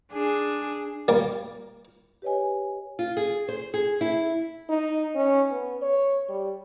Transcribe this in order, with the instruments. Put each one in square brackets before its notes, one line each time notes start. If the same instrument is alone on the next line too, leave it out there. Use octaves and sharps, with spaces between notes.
[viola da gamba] D4 G#4
[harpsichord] G3 A#3
[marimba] G4 B4 C#5 D#5 G#5
[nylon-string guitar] F4
G#4
C5
G#4
E4
[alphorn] D#4
C#4
B3
C#5
G3